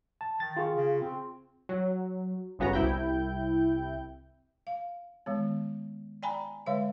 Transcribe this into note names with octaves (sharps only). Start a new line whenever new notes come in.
A5
D#3 A6
F4 G#4 C#6
C#3
C4
F#3
G1 C#3 B3 F#4 A#5
C2 E4 G5 G6
F5
D#3 G#3 B3
D5 G5 G#5 A#5 B5
D3 G#3 C#5 E5 F5